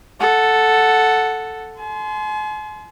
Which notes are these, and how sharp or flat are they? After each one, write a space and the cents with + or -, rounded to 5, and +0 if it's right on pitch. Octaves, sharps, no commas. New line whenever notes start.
A4 +0 F#5 +0
G#5 +45 C6 -15